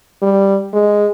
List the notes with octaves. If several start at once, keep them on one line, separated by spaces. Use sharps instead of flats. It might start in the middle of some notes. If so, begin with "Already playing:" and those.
G3
G#3